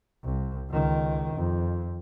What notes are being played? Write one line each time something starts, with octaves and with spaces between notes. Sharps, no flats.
C2
C#2 D#3
F2